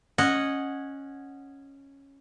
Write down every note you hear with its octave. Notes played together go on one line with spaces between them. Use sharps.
C#4 D#5 F#5